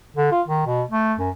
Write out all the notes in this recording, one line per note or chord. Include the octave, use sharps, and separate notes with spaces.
D3
F4
D#3
B2
A3
F#2